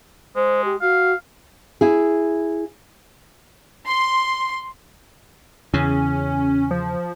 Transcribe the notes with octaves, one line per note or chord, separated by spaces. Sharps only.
G#3 C5
G4
F#4 F5
E4 G#4
C6
E2 C#3 C#4
F3